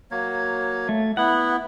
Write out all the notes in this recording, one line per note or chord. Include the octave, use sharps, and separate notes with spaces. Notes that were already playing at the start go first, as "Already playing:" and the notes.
F#3 A#3 C#5
A3
B3 E4 F#5